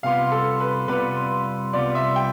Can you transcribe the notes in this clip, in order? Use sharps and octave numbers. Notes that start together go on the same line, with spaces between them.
C2 C3 G3 B3 F4 F5
A4
B4
C2 C3 G3 B3 F4 B4
C2 C3 G3 B3 F4 D5
E5
G5